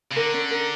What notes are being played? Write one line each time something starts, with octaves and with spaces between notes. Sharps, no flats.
C#3
D3 A#4
C#4
A#4